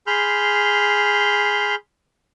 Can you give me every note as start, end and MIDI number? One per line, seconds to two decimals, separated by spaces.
0.07 1.75 68
0.07 1.75 83
0.07 1.75 84
0.07 1.75 89
0.07 1.75 91